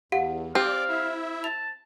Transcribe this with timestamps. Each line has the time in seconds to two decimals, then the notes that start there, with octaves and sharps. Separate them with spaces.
0.12 E2 G4 F5 F#5
0.55 C4 G4 D5 F5 D6 G6 C7
0.89 E4 E5
1.44 A5 F7